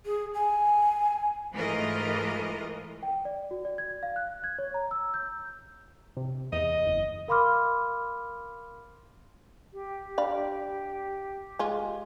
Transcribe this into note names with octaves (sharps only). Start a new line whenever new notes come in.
G#4
G#5
G#2 E3 A3 F4 A#4 D#5
G5
D5
F#4
D5
G#6
F5
F#6
G#6
C#5
A#5
E6
G6
C3
E2 D#5
F#1
A#4 F5 B5 C6 D6 F6
G4
D4 F5 B5
G#3 F4